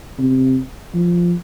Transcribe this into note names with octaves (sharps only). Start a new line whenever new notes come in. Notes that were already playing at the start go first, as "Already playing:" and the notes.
C3
F3